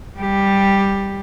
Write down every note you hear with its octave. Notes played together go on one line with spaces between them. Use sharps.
G3 G4